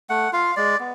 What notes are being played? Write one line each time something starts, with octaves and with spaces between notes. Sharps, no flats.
A3 F#5
F4 F5
G#3 D5
B3